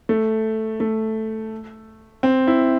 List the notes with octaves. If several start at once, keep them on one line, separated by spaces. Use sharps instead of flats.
A3
A3
C4
E4